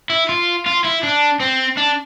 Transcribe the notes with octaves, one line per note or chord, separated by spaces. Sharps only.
E4
F4
F4
E4
D4
C4
D4